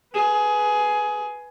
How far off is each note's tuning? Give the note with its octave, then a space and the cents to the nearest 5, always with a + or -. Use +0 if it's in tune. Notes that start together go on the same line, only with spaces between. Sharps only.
G#4 +15 B4 +0